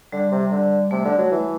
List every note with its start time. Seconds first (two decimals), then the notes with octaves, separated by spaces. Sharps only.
0.12 D3 G3
0.32 C3
0.51 D3
0.91 C3 A3
1.05 D3
1.18 F#3
1.32 E3